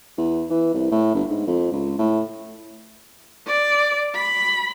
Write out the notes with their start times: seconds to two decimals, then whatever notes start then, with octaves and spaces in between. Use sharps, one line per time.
0.18 E2
0.50 E3
0.74 C2
0.91 A2
1.14 G1
1.30 G#2
1.47 F2
1.72 C#2
1.98 A2
3.47 D5
4.15 B5